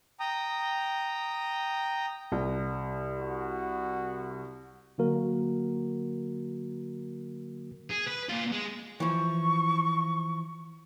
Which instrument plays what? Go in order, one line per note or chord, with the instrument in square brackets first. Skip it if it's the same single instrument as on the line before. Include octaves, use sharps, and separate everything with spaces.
[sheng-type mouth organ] G5 A#5 D#6
[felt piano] C2
[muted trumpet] F#4
[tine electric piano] D3 F#3 A#3 F#4 A#4
[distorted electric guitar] G#4
B4
A#2 F4
G#3
[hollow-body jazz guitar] E3 F3 [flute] C#6